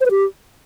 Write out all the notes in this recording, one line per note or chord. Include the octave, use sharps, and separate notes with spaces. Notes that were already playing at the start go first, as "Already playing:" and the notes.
C5
B4
G4